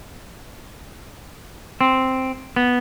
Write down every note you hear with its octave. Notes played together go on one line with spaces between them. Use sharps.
C4
B3